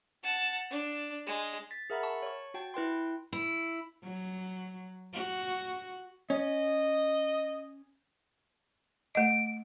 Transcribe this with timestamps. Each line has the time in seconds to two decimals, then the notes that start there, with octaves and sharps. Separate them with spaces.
0.23 F#5 A5
0.71 D4
1.26 G#3
1.71 A6 B6
1.90 G#4 A#4 E5 F#5 A#5 B5
2.03 A5 C#6
2.23 C#5 C#6
2.54 F#4 G5 A5
2.74 E4 B4 G5 C6
3.33 E4
4.04 F#3
5.14 F#4
6.30 C#4 D#5
9.15 A3 D#5 D7